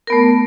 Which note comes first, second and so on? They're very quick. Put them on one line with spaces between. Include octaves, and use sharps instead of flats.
A#4 B3 A3